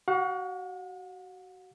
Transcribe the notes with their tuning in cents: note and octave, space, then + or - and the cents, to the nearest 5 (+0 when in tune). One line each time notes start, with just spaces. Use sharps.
F#4 +25 F#5 -45